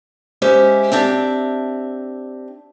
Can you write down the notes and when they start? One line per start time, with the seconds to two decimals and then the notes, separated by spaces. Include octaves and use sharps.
0.42 G#3 C#4 E4 G4 C5 E5
0.92 C4 D4 G4 E5